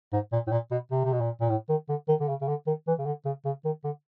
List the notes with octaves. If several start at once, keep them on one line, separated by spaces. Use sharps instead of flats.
G#2
A#2
A2
A#2
B2
C3
C3
B2
A#2
A#2
A2
D#3
D3
D#3
D3
C#3
C#3
D3
D#3
E3
C#3
D3
C#3
C#3
D#3
D3